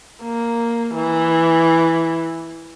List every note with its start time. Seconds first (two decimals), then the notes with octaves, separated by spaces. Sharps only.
0.23 A#3
0.94 E3